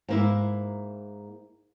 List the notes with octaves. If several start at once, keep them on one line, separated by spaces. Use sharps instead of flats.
G#2 A#3 E4